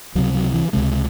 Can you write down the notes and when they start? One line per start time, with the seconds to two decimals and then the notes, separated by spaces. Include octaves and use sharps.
0.15 C#2 C3 F#3
0.34 F#3
0.54 E3
0.73 C#2 C3 G#3